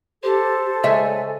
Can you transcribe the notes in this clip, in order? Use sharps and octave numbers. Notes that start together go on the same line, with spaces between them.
G4 A4 C5
C#3 G#3 E5 G#5